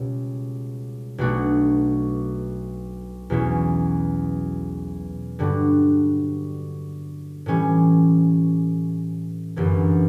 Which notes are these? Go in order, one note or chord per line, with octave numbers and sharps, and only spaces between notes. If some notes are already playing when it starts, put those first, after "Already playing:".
Already playing: C#2 B2 G3
B1 B2 A3 D4 F#4
E2 B2 F#3 C#4 E4
G2 D3 G3 D4 F#4
A2 E3 G3 C#4
G1 F#2 E3